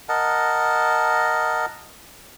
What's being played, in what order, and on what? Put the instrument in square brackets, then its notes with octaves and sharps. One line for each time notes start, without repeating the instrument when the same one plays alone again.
[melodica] A#4 D#5 F#5 A5